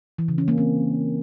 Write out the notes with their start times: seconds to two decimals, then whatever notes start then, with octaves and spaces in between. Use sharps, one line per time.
0.18 E3
0.28 C#3
0.38 C#4
0.48 A#3
0.58 C4